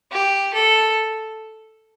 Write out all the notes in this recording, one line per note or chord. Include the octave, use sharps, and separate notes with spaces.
G4
A4